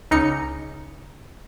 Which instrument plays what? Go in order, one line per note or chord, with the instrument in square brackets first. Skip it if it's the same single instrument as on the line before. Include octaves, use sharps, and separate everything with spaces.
[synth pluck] C#2 D#4 C#7